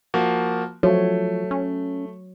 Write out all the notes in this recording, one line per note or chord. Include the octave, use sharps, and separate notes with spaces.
F3 A#3 F#4
F3 F#3 A3 F#4 C#5
C#4